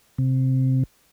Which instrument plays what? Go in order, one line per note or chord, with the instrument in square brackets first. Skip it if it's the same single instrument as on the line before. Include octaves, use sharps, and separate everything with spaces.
[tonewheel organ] C3